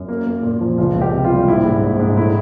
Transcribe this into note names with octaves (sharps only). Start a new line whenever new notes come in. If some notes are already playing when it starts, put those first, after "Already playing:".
Already playing: F#2
A#3
A#3
A#2
F3
C#2 F4
C#2
G4
C3
F4
G3
A#1 E4
G#2
A#1
G#2
A2 E4